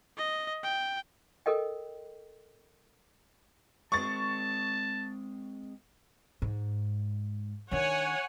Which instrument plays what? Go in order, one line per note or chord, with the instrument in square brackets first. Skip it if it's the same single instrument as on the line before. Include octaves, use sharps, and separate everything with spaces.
[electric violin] D#5
G5
[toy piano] A4 A#4 D#5 G5
[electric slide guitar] G#3 C4 [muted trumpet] A5 [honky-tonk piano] C#6 A6
[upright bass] G#2
[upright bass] D#3 D4 [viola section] C#5 F#5 G#5